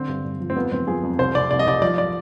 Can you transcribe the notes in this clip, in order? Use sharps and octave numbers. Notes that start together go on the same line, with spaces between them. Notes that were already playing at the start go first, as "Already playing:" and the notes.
Already playing: D3 C4
G2
G2
F3
C4
F2 B3
F2 C4
F3 G#4
F2
C2 C5
C2 D5
C2 D5
D#5
C2 D5
F3 D5
D5